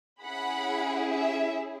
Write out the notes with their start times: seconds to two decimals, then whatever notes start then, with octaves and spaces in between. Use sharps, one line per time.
0.24 C#4 E4 G#4 F#5 B5
1.11 E5